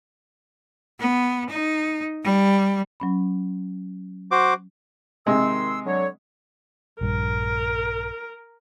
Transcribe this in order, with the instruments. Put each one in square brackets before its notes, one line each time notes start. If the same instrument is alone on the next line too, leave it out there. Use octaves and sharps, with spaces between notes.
[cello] B3
D#4
G3
[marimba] F#3 C#4 B5
[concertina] F#4 C5 D6
[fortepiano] C3 G#3 [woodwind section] D#3 C6 E6
[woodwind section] D3 F#3 C#5
[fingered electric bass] A#1 G2 [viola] A#4